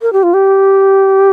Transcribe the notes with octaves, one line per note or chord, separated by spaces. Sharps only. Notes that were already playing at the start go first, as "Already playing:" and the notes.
A#4
G4
F4
G4